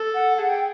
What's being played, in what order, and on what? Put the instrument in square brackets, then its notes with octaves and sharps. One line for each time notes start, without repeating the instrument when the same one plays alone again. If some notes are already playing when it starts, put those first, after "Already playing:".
Already playing: [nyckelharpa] A4
[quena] F#5
[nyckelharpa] G#4 [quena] F#5
[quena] G5